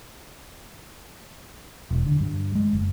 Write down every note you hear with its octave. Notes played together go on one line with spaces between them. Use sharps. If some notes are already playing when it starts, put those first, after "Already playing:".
E1
D3
G2
G#3
F#1